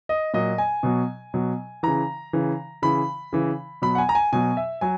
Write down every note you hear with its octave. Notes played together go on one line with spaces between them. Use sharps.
D#5
A#2 F#3 D#5
G#5
B2 F#3
B2 F#3
C#3 E3 A#5
C#3 E3
C#3 E3 B5
C#3 E3
B2 F#3 B5
F#5
G#5
A#5
G#5
B2 F#3 G#5
E5
F#3 G#5